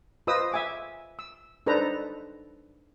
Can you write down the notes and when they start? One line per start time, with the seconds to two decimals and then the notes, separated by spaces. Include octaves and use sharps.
0.27 F4 B4 C5 D#5 D#6 E6
0.52 E5 G#5 D6
1.19 E6
1.66 D4 D#4 A4 B4 C5 A#5